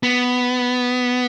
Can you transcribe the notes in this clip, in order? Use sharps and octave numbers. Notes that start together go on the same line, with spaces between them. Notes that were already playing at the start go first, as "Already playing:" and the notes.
B3